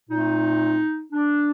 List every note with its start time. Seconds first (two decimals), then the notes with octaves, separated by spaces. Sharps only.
0.09 A#2 A3 C4 D#4
1.13 D4